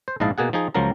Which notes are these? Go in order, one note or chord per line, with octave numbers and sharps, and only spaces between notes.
C5
A#1 G#2 E4 D#5 F5 A5
B2 A#3 G#4 F#5
F3 D#4 G#4
C#2 F3 F#3 A#4 A#5